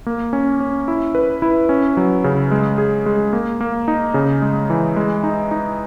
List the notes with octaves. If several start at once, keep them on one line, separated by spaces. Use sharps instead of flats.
A#3
C#4
C#4
E4
B4
E4
C#4
F#3
C#3
G#3
G#4
G#3
A#3
A#3
D#4
C#3
G#3
E3
G#3
D#4
D#4